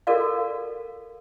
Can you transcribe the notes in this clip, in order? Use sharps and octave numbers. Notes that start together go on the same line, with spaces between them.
F#4 A4 A#4 D5 F5